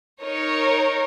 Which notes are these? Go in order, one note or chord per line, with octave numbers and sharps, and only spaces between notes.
D#4 A#4 C#5